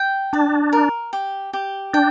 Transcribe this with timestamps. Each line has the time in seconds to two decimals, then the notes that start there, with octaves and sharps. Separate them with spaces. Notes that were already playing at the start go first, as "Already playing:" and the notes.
Already playing: G5
0.33 D4 D5
0.73 A#4
1.13 G4
1.53 G4
1.94 D4 G5